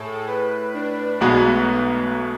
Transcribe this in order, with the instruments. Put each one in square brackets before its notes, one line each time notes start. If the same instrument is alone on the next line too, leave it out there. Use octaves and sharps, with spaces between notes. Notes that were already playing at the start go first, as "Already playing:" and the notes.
Already playing: [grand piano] A2 [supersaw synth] G#4 A4
[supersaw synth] B4
D4
[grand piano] B1 B2 G#3 B3 F#4 [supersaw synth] A3